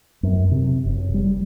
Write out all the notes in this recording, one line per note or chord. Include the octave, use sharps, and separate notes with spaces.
F#2
C3
F#1
G3